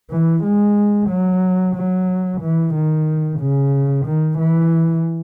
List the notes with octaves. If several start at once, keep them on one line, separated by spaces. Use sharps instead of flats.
E3
G#3
F#3
F#3
E3
D#3
C#3
D#3
E3